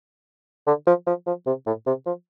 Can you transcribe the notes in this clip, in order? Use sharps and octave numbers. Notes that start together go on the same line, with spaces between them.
D3
F3
F3
F3
C3
A2
C3
F3